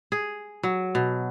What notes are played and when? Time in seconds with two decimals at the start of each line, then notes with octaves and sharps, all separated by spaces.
0.12 G#4
0.63 F#3
0.95 B2